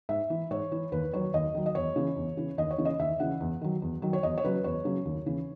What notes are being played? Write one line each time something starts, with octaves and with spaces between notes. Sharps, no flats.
G#2 E5
E3
G#2 C#5
E3
D#2 B4
D#3 F#3 C#5
D#2 D#5
D#3 F#3
D#5
E2 C#5
C#3 E3
E2
C#3 E3
D#2 D#5
C#5
C#3 E3
D#5
D#2 E5
C#3 E3 F#5
E2
D#3 F#3
E2
D#3 F#3
C#5
E2 D#5
C#5
C#3 F#3 B4
E2 C#5
C#3 F#3
D#2
C#3 E3